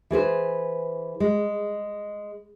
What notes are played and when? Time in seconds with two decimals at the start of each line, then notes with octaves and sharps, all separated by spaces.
0.10 E3 G#4 B4 C5
1.20 G#3